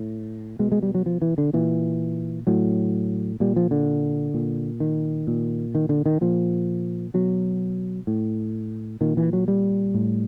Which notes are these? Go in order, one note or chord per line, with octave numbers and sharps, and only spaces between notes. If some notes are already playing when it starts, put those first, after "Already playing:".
Already playing: A2
B2 G#3
G#3
G3
F#3
F3
E3
D3
A#2 E3
A2 F#3
A#2 G3
F3
D3
A#2
D#3
A#2
D#3
D3
D#3
A#2 F3
B2 F#3
A2
A#2 D#3
E3
F#3
G3
A2